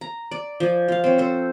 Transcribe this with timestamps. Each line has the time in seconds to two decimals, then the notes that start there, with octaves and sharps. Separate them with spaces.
0.01 A#5
0.31 D5
0.60 F3 G#5
0.88 F4 F5
1.04 C4 C#5
1.18 A4 C5